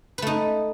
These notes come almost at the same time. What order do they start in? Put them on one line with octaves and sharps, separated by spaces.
B4 A3 D#4